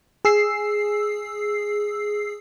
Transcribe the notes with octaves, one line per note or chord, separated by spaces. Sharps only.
G#4 E6 C7